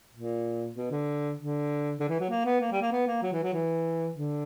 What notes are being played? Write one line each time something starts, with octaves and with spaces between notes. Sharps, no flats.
A#2
B2
D3
D3
D3
E3
F#3
A#3
B3
A#3
G3
A#3
B3
A#3
F#3
E3
F#3
E3
D3